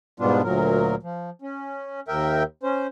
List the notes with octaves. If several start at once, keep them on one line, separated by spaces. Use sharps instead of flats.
G#2 B2 G3 B3 D4 F4
D2 A#2 F#3 A#4
F3
C#4
D#2 A#4 E5 G5
C#4 C5